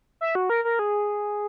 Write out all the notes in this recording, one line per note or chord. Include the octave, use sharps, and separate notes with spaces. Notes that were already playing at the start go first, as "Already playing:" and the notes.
E5
F#4
A#4
A#4
G#4